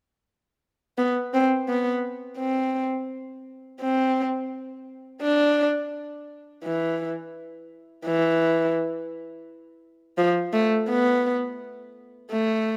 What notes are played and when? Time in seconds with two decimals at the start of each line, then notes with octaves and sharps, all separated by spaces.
0.98 B3
1.34 C4
1.68 B3
2.39 C4
3.81 C4
5.22 D4
6.64 E3
8.05 E3
10.17 F3
10.53 A3
10.89 B3
12.31 A3